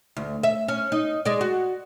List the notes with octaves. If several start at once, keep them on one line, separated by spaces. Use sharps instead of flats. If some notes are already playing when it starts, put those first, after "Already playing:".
D2
E5
C#4
D#4
G#3 D5
F#4